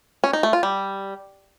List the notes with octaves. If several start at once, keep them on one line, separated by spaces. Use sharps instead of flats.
C#4
D#4
A3
F4
G3